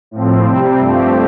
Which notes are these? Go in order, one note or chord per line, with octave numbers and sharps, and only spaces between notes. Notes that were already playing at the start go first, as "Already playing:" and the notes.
A2 F3 C4
C3 G3 C4
G2 F3 A3 C4 G4